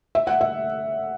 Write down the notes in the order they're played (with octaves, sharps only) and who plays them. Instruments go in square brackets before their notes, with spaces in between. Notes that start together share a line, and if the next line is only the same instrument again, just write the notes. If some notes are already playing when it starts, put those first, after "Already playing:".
[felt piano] E5
F#5
E5